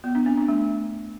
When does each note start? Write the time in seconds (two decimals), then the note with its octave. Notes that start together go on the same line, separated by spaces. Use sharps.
0.04 B3
0.15 D4
0.26 C4
0.37 D4
0.48 A3